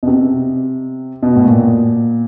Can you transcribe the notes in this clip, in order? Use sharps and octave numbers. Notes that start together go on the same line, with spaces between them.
B2
C3
B2
A2
A#2